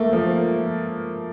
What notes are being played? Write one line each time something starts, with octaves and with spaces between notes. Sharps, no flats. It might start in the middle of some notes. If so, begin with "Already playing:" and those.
Already playing: A3 A#3
F3